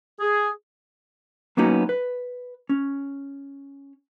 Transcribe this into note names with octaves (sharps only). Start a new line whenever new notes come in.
G#4
F#3 A#3 B3 C#4 D#4 F#4
B4
C#4